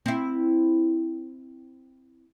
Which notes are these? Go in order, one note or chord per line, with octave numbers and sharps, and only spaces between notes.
C4 E4